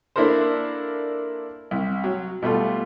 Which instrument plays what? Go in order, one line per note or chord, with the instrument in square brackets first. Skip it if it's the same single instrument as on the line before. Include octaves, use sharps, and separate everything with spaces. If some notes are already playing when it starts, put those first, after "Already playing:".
[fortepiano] A#3 D4 E4 A4 A#4 C5
C2
F#3
B2 G3 A3 F4